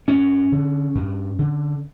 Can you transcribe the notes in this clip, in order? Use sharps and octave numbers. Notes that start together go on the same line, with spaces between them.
G2 C#4
D3
G2
D3